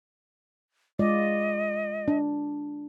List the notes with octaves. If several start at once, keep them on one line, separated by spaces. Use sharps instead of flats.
G#3 F4 D5 D#5
D4